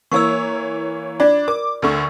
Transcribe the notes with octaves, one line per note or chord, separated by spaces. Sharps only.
E3 A#3 C#5 C#6 E6
D4 F4 D5
A#4 D6
D2 D3 C#6